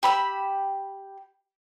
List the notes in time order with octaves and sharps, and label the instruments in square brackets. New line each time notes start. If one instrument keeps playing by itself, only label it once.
[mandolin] G4 B5 E6